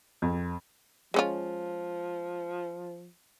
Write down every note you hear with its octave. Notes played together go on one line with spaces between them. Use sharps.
F2
F3 G#3 C#4 F4